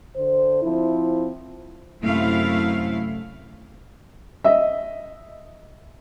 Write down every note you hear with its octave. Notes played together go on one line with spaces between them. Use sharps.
D3 C5
F3 C4 E4
F#2 C3 A3 E4 F5
D#5 E5